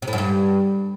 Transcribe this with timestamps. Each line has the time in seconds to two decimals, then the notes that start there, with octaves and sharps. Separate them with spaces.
0.02 C3
0.08 A2
0.13 F#2
0.18 G2